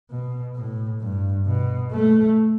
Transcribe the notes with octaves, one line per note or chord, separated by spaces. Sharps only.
B2
A2
G2
B2
A3